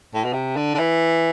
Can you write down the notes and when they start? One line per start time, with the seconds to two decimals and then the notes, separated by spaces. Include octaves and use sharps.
0.14 A2
0.24 B2
0.33 C3
0.57 D3
0.75 D3
0.79 E3